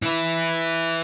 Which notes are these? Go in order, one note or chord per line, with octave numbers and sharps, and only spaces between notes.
E3 E4